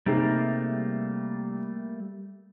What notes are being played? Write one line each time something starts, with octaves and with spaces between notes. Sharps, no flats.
C3 G3 A3 A#3 D#4 G#4